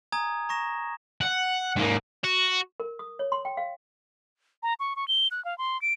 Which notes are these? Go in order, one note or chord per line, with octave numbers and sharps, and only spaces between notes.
G#5 A#5 D#6 G#6
A#5 C#6 A#6 E7
F#5
G#2 A#3
F#4
A#4
D#6
C#5
C6
G5
F5
A#5
C#6
C#6
G7
F#6
F5
C6
D7